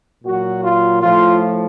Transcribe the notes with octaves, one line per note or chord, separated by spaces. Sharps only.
A#2 F#3 F#4
F4
A2 F3 F4